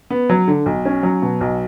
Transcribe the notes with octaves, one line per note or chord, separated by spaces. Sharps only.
B3
F#3
D3
B1
C#4
F#3
B2
B1